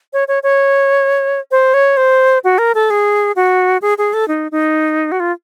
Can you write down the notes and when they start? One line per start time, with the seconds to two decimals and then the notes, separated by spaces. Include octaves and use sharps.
0.13 C#5
0.28 C#5
0.43 C#5
1.51 C5
1.74 C#5
1.97 C5
2.44 F#4
2.58 A#4
2.75 A4
2.90 G#4
3.36 F#4
3.82 G#4
3.98 G#4
4.13 A4
4.28 D#4
4.52 D#4
5.12 F#4
5.20 F4